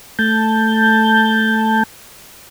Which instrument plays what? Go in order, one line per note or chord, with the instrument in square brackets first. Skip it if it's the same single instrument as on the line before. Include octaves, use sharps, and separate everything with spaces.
[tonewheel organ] A3 A5 G6